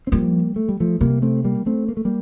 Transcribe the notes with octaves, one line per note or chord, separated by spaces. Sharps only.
C4
F3 G3 A#3
A3
G3
F3 A3
C3 G3 A#3
A3 C4
G3 A#3
A3 C4
A#3
A3
G3 A#3